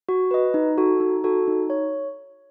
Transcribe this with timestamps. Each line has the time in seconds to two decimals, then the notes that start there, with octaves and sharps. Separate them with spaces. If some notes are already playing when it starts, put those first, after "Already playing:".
0.09 F#4
0.31 B4 D#5
0.54 D#4
0.78 F#4 A4
1.00 D#4
1.24 F#4 A4
1.48 D#4
1.70 C#5